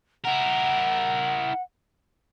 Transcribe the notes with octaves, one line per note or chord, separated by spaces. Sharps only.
E4 A#4 F#5